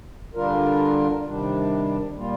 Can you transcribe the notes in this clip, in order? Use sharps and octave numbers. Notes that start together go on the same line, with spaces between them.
D3 G3 D4 F4 A#4
C3 D#3 G3 D4
A#2 G3 A#3 F4